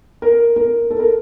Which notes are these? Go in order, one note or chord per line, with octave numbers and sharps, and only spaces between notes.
A#4
A#4
A4
A#4